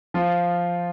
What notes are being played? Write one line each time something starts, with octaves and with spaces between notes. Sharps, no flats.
F3 F4